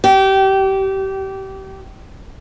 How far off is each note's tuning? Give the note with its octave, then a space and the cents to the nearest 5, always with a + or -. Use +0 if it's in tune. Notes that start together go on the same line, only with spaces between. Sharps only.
G4 -25